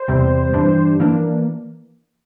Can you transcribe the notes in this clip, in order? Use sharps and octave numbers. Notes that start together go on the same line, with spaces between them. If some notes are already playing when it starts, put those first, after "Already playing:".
Already playing: C5
E2 C3 G3 C4
G2 E3 G3 D4
E3 A#3 D4